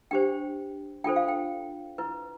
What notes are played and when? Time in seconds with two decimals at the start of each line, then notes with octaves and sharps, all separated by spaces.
0.11 D4 G4 C5 G5
1.04 D4 F4 A4 C5 G5
1.16 F5
1.28 G5
1.98 E4 B4